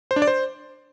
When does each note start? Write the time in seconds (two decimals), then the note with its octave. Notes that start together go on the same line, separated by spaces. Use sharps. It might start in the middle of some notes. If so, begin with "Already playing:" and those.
0.11 C5
0.16 D4
0.22 D5
0.28 C5